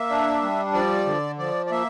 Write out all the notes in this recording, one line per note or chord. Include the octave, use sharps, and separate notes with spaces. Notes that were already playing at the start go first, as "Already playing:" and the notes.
Already playing: A#3 E5
D4
G3
F3 D5
D3
F3 D5
D5
A#3 E5